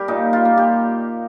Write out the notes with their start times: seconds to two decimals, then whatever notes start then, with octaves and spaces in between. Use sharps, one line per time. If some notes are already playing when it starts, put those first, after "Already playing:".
Already playing: G3 G4 A#4
0.08 A#2 D#4
0.33 F4
0.45 A#3
0.58 G4